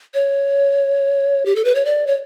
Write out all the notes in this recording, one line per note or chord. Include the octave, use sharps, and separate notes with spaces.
C#5
G4
A4
B4
C#5
D5
C#5